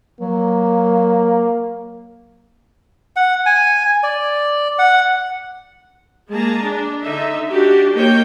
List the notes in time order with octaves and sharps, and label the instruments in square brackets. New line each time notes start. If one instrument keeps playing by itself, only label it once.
[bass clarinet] F#3 [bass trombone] A#3
[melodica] F#5
G#5
D5
F#5
[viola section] G#3 A#3 G#4 A5 A#5
D4
D3 D#4 E5
D4 F#4 G4
A#3 D#4 C#5 G5